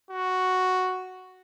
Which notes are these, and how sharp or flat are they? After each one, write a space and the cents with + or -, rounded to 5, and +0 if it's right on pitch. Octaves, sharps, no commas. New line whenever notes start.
F#4 +0